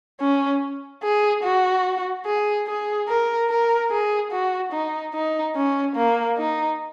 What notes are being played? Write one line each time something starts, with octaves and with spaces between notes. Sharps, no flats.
C#4
G#4
F#4
G#4
G#4
A#4
A#4
G#4
F#4
D#4
D#4
C#4
A#3
D#4